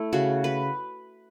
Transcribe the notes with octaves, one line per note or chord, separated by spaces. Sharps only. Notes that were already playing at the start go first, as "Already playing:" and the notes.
Already playing: A3 E4
C#3 F#4
B4